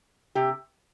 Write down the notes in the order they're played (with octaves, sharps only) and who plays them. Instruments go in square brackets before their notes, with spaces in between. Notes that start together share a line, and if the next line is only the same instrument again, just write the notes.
[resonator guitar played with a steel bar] C3 G4